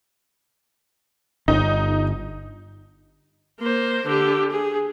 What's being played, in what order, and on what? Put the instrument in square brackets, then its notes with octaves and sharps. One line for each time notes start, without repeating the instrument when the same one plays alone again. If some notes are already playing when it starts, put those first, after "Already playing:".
[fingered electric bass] G1 [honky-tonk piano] D#4
[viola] A#3 C5
D3 G4
G#4